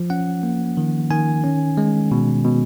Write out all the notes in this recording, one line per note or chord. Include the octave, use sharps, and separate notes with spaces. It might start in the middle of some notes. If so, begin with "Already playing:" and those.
Already playing: F3
C#4 F#5
A#3
D#3
D#3 G#5
C#4
G#3
B2
B2